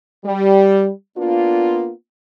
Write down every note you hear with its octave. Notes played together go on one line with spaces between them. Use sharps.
G3
A#3 B3 D4 F4